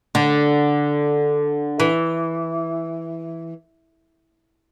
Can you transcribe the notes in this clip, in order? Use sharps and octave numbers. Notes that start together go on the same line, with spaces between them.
D3
E3